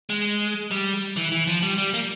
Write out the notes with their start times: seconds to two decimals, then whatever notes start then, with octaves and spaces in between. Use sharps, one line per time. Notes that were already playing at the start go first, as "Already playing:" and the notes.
0.10 G#3
0.71 G3
1.16 E3
1.32 E3
1.47 F3
1.62 G3
1.78 G3
1.93 A#3